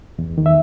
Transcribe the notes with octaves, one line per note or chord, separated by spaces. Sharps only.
E2
D#3
E5